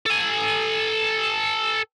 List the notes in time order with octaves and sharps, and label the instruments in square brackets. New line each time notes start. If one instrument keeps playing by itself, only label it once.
[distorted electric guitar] A4 G#5